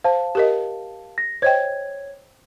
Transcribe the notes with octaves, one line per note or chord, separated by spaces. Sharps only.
C5 F5 A5
G4 A#4 D#5
A#6
C5 C#5 D#5 G5 G#6